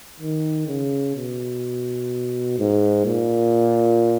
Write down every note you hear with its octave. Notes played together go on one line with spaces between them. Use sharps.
D#3
C#3
B2
G#2
A#2